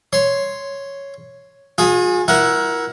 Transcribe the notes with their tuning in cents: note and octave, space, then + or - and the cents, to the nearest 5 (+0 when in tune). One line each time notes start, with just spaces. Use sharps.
C#5 +0 C6 +0
F4 +45 G#4 +0
E4 +5 A#4 +20 F#5 +0